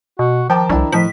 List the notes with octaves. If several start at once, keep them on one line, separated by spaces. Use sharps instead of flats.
B2 F#4
D#3 F3 G5 A5 D6
C2 D4 E4
A2 F3 D#5 B6